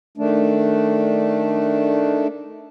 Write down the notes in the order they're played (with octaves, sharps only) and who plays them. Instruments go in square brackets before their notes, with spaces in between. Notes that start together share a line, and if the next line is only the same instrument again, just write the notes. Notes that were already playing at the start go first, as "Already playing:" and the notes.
[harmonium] D#3 A3 D4